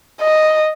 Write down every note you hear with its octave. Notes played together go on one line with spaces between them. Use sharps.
D#5